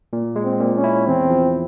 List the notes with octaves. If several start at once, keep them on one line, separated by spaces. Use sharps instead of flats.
A#2
G#3
C4
A#2
C#4
E4
E2 C4
F3